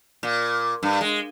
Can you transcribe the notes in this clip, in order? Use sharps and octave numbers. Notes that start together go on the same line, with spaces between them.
A#2
G2
G#3